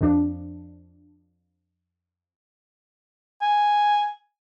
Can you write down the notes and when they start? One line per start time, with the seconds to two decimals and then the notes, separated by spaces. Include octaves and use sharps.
0.01 F2 F3 D4
3.42 G#5